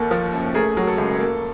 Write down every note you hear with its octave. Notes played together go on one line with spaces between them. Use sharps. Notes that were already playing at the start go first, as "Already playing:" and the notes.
Already playing: D#2 A#3 A4
F3
F#2
A3 G#4 A#4
F#3
A4
C#2
A#3